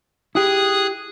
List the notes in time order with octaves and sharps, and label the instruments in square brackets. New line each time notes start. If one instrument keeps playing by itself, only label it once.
[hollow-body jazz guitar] E4 G4 [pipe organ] G#4 D#6 F#6